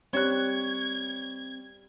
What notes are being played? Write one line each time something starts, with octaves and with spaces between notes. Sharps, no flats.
G3 C4 C#5 F#6 G#6